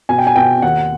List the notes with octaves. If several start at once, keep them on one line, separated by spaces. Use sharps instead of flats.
B2 G#5
G5
G#5
B2 G5
D#2 F#5